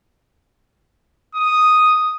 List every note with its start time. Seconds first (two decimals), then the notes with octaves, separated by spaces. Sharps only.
1.35 D#6